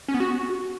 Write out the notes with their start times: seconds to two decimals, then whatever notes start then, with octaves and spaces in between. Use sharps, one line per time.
0.08 C#4
0.14 B3
0.20 F#4